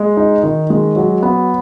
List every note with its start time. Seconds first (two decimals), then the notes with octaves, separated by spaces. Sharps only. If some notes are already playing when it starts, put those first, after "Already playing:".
Already playing: G#3
0.17 D#4
0.43 D#3
0.70 G#3
0.96 F#3
1.23 B3